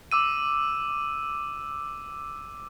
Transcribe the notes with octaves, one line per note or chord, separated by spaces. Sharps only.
D6 E6 D#7